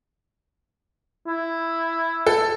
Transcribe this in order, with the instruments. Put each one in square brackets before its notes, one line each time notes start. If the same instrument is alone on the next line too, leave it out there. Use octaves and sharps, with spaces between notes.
[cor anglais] E4
[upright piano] A4